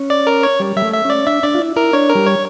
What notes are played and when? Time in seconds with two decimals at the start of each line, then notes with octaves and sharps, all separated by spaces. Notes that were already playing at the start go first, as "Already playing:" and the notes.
Already playing: C#4
0.10 D5
0.27 A#4
0.43 C#5
0.60 G3
0.76 G3 E5
0.82 A3
0.93 E5
1.05 C#4 D5
1.27 D4 E5
1.43 D4 D5
1.54 F4
1.60 E4
1.76 E4 A#4
1.93 D4 C#5
2.10 A#4
2.15 G3
2.26 C#5